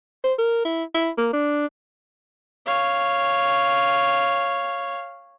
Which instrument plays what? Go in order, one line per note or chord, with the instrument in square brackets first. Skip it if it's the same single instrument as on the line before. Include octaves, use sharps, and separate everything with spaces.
[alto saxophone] C5
A#4
E4
E4
A#3
D4
[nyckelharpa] C#5 F5